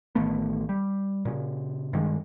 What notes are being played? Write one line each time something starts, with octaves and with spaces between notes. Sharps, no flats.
A1 D#3 A3 B3
G3
A#2 C#3
G2 D#3 G#3